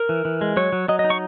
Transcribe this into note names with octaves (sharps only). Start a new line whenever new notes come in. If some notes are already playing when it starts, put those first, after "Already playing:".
Already playing: A#4
E3
E3
G#3
F#3 C#5
F#3
F#3 D#5
D#5
D#4
C#6